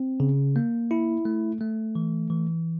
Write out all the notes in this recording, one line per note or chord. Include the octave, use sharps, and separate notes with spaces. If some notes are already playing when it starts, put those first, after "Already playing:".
Already playing: C4
C#3
A#3
E4
A3
A3
E3
E3